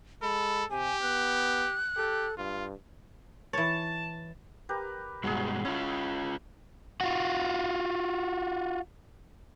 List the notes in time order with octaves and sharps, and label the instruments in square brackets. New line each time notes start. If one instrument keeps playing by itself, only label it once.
[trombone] G#3 [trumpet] A4 [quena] B5
[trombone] C3 [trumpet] G4 [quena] G#5
[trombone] B3 [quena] F#6
[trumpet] G4 [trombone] A4
[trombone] G2 [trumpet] F4
[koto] E3 C#5 [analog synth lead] A5
[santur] G4 A#4 B4
[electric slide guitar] G2 B2 G#3 [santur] F#3 G#4
[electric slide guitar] C#4 F4 [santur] E4
[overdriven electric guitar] F4 F#4